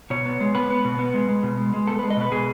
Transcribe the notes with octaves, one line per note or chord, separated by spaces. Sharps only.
B2 C#5
B3
G#3
B3 B4
B3
B2
B3
G#3
G#3
B2
G#3
G#3
B3 A4
G#3 B4
D#5
B2 B4
B2 G#4